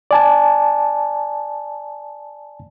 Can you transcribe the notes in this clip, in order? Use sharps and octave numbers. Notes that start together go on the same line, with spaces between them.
D5 G#5 A5